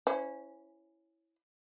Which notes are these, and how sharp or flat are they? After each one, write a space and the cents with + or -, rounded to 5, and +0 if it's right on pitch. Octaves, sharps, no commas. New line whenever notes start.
C#4 +0 E4 +0 C5 -25